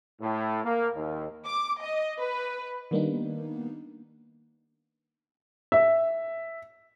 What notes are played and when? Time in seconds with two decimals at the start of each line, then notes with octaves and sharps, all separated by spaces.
0.21 A2
0.64 A#3
0.95 D#2
1.48 D6
1.83 D#5
2.18 B4
2.91 D#3 G3 A#3 B3 D4 D#4
5.72 E5